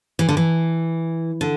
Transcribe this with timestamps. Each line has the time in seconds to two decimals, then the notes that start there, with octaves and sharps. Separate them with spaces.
0.19 E3
0.29 D3
0.37 E3
1.41 D3